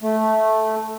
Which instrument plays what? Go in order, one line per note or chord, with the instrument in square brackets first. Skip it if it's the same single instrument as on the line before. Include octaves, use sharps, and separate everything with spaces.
[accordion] A3